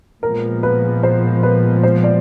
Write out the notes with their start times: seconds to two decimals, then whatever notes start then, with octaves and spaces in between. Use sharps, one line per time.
0.23 A#2 F3 G#3 B3 A#4
0.63 B4
1.03 C5
1.43 B4
1.83 C5
2.04 D5